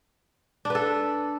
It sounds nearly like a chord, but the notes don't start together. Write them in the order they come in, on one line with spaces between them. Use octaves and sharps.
D4 B4 A4